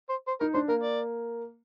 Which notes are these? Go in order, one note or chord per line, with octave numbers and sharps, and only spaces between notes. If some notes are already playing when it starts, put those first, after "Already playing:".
C5
C5
D#4 A#4
D4 C5
A#3 A#4
D5